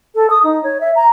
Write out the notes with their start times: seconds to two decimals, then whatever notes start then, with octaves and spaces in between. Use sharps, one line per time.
0.15 A4
0.30 D#6
0.44 D#4
0.63 C#5
0.81 E5
0.96 A#5